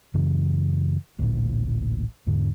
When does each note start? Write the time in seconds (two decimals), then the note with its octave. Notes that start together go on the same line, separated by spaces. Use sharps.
0.14 F#2 C#3 E3
1.19 D1 A1 A#2
2.27 E2 G#2 D3